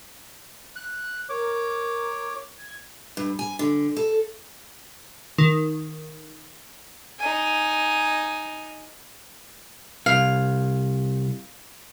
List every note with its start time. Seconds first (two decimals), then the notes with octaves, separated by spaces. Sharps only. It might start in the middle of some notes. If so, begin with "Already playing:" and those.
0.76 F#6
1.29 A#4 C#5 D6
2.58 G#6
3.17 G2
3.39 G#5
3.59 D3
3.97 A4
5.38 D#3
7.19 D#4 G#5
10.06 C2 F5